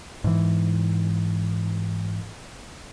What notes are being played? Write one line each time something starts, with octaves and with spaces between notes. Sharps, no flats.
G#2 E3